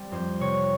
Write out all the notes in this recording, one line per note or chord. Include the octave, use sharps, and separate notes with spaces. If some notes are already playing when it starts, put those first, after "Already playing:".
Already playing: G3 C4
F2 C5
C3 C#5